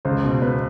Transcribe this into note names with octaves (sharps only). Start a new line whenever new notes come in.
C#2 C5
B2
B2 B4